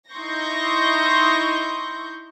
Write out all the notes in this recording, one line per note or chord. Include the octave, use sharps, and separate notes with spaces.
D#4 E4 C6 C#6 G6 A#6